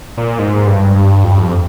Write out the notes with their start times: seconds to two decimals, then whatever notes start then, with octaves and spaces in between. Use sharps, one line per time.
0.17 A#2
0.39 G#2
0.67 G2
0.96 G2
1.24 F2
1.31 G2
1.39 F2